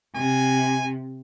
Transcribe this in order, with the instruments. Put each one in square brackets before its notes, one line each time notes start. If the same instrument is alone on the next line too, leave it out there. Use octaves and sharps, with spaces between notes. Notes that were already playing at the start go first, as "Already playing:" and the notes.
[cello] C3 [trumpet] G#5